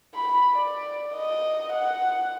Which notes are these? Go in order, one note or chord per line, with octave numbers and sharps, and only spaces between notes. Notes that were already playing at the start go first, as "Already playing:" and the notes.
B5
D5
D#5
F#5